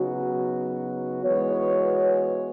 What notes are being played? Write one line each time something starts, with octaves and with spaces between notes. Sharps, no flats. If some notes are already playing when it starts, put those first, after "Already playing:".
Already playing: C#3 F#3 B3 D#4 F#4
E3 G#3 B3 F#4 C#5